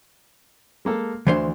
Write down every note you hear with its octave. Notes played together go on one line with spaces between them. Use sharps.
G#3 A#3 A4
D2 D3 E3 C5 C6